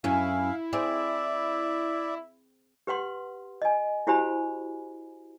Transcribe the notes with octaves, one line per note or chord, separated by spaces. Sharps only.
F#2 C#4 E4 F5
C4 G#4 D5 E5
G4 B4 F#5 C6
D#5 G#5
E4 F#4 G4 C5 G#5 B5